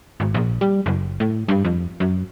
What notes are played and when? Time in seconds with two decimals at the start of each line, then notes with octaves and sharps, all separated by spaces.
0.20 G#1
0.34 A#1
0.61 G3
0.86 F#1
1.20 A2
1.48 G2
1.65 F2
2.00 F#2